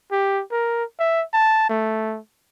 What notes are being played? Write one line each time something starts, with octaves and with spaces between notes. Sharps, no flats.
G4
A#4
E5
A5
A3